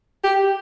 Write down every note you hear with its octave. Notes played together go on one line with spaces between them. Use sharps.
G4